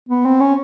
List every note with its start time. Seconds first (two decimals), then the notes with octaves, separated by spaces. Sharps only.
0.09 B3
0.25 C4
0.40 C#4